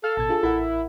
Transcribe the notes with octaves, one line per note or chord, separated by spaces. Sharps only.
A4 F5
A1 B2 A5 G#6
D4 F4 G#4
A1 E4 A#4 F#5